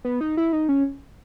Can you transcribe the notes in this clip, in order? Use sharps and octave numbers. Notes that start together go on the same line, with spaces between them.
B3
D#4
E4
D#4
C#4